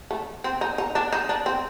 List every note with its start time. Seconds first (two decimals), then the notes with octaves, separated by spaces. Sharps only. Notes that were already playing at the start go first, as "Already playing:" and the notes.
0.11 A3
0.44 C4
0.61 D#4
0.78 D#4
0.95 D4
1.13 D#4
1.29 D4
1.46 C4